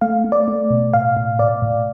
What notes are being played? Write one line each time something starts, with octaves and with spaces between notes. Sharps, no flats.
A3 F5
A3
D5
A3
B2
A2 F5
A2
A2 D5
A2